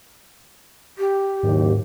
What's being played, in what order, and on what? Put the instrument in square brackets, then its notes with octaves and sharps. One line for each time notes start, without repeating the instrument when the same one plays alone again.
[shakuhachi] G4
[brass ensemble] F#1 D#2 [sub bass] G#2